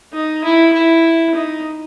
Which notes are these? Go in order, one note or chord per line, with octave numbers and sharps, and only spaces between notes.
D#4
E4
E4
D#4